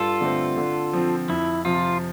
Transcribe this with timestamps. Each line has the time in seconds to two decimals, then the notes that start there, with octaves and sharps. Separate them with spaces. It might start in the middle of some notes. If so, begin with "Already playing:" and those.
Already playing: G2 F4 A4
0.21 D3 A3 C4
0.57 D3
0.93 F3 C4
1.28 F2 E4
1.65 C3 F3 F4